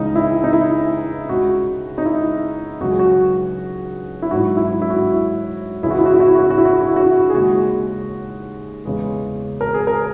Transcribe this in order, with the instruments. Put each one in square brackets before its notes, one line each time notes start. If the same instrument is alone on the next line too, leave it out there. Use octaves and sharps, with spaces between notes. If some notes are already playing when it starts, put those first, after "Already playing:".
Already playing: [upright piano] C#2 C#3 E3 G#3 D#4
E4
D#4
E4
C#2 C#3 G#3 F#4
D#4
E4
C#2 C#3 F#3 F#4
G#4
F#4
E4
G#2 F#3 F#4
E4
E4
F#4
E4
C#2 C#3 E3 G#3 E4
F#4
E4
F#4
E4
F#4
E4
F#4
E4
F#4
E4
F#4
E4
F#4
E4
F#4
E4
G#4
D#2 C#3 G#3 F#4
E2 C#3 G#3
A#4
G#4
A#4